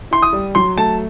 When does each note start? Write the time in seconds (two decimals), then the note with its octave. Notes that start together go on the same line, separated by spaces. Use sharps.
0.11 E4 C6
0.22 D#6
0.33 G3
0.55 F#3 C6
0.77 A3 A5